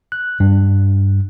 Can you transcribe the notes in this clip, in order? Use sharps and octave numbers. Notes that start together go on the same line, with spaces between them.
F#6
G2